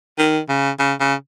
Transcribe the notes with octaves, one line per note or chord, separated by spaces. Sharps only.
D#3
C#3
C#3
C#3